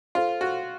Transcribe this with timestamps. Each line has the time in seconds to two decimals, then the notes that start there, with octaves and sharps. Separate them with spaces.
0.15 F4 A4 C5 F5
0.41 F#4